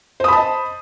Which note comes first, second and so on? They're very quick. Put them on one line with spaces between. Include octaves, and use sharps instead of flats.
C5 D#6 B5 A5 D#5